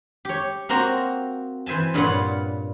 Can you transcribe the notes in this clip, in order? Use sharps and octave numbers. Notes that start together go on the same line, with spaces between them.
G4 C#5
A#3 C4 F#4 C5 A#5
E3 C5 E5 G#5 A5
G2 A#2 F4 B4 C#5 F#5